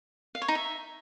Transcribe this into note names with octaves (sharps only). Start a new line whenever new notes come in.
F5
C#5
D#4
E5